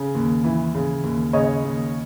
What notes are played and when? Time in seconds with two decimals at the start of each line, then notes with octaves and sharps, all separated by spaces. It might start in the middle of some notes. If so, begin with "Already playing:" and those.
Already playing: C#3
0.15 D#2
0.44 E3
0.75 C#3
1.04 D#2
1.33 C#3 C#5 D#5
1.64 D#2